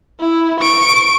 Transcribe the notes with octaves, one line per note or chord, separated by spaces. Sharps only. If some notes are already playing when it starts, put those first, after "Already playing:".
E4
C#6 D7